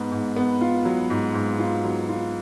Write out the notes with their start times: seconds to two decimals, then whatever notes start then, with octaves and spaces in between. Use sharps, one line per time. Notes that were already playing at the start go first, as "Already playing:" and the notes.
Already playing: G#2 B3
0.11 G#2
0.36 B3
0.61 F4
0.85 F#3
1.10 G#2
1.34 G#2
1.59 F4
1.84 F#3
2.09 F4